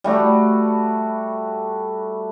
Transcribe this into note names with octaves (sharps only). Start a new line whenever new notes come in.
G3 A3 F#4